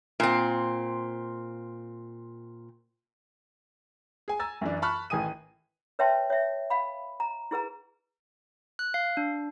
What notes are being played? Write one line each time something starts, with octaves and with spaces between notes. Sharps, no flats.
A#2 C4
G#4 G#5
G#5 A#5 E6 A6
F#2 E3 D4
A5 B5 C#6 F6 F#6
A1 D#3 G#5 D#6 D#7
B4 C#5 E5 G5 A5 C6
C#5 E5
F5 B5
A#5
E4 G#4 B4 A#5
F#6
F5
D4